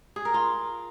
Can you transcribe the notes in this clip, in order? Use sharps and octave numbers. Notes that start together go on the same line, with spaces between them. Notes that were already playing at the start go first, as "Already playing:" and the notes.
G#4
A#4
F4